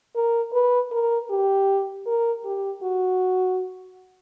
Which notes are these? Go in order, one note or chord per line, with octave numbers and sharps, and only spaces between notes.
A#4
B4
A#4
G4
A#4
G4
F#4